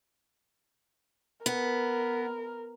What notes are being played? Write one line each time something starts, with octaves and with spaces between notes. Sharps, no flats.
B3 A#4